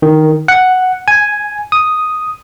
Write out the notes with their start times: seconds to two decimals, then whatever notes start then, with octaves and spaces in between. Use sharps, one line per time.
0.02 D#3
0.48 F#5
1.08 G#5
1.72 D#6